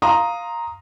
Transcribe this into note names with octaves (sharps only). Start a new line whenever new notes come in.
F5 A#5 C6 D#6